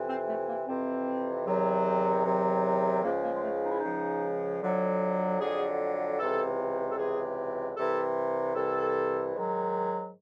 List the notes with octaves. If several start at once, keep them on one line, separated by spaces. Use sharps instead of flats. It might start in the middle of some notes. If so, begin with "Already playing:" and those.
Already playing: F2 C3 E3
C4
A3
A#3
F2 C3 E3 C4
E2 C3 D#3 F#3
E2 C3 D#3 F#3
C#2 C#3 F3 A#3
A#3
G#3
A3
D#4
E4
D#4
C#2 C#3 F3
F2 D3 F#3
F2 D3 F#3 G#4
C#2 C3 E3 A4
A4
C#2 C3 E3 G#4
C2 C3 E3 A4
C2 C3 E3 A4
G#2 D#3 F#3